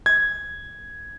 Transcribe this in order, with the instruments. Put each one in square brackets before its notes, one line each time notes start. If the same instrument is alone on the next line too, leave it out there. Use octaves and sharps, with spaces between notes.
[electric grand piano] G#6